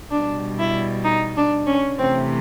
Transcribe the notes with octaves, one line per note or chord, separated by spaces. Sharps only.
B2 G3 D4
E4
D#4
D4
C#4
C3 E3 A3 C4